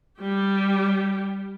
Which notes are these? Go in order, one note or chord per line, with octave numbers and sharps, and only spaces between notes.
G3 G4